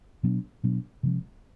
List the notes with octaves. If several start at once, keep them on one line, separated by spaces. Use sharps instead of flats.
B2 F#3 B3 D4
B2 F#3 B3 D4
C3 F3 G#3 C#4